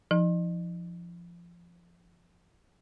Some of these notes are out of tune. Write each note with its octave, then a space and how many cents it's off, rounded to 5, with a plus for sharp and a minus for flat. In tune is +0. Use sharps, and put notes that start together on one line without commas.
F3 -20 D#4 +0